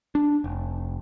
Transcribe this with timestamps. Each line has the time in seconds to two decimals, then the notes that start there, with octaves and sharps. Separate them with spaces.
0.15 D4
0.44 F1